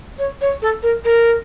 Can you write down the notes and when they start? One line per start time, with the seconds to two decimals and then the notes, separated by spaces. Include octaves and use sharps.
0.19 C#5
0.41 C#5
0.62 A4
0.83 A#4
1.05 A#4